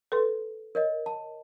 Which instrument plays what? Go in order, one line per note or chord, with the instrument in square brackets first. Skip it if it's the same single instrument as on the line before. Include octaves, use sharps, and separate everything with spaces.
[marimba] A4 B4 C6
[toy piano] A#4 C#5 D#5
A5